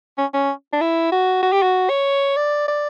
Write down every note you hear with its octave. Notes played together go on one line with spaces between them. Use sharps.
C#4
C#4
D4
E4
F#4
F#4
G4
F#4
C#5
D5
D5